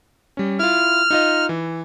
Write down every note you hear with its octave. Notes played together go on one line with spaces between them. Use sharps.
G3 C#4
E4 F4 F6
D#4 F4 D#5
E3